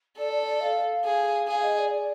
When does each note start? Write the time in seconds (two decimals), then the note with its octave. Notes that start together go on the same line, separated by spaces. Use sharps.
0.18 A4 D5
0.32 D5
0.47 D5
0.62 F5
1.05 G#4
1.48 G#4 F5
1.62 D#5
1.78 D5
1.91 D5